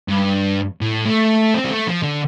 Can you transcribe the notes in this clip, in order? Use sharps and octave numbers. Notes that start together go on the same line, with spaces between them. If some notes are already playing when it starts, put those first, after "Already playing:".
G2
A2
A3
C4
G3
A3
F3
D3